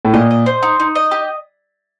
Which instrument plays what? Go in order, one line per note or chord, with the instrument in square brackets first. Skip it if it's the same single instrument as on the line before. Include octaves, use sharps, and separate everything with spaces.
[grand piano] A2
[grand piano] A#2 [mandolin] D#5
[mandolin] D#5
C5
D#4
D#4
D#5
G4